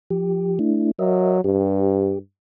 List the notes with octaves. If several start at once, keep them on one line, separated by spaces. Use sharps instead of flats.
F3 G4
A3 D4 E4
F#3 A#4 D#5 E5
G2 G4